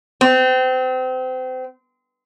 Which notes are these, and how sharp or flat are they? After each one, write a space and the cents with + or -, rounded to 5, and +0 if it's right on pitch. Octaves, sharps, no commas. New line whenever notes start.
C4 -30